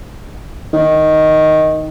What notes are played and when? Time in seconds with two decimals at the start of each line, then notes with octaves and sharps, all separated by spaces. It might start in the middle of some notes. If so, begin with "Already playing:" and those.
0.73 D#3